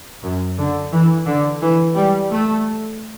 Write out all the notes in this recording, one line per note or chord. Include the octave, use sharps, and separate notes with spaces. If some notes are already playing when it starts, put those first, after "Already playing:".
F#2
D3
E3
D3
E3
G3
A3